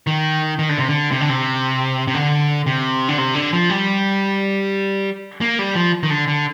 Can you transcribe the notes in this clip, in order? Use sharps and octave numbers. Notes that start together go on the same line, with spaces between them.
D#3
D#3
D3
C3
D3
C3
D3
C3
C3
D3
C3
D3
C3
D3
F3
G3
A#3
G3
F3
D#3
D3
D3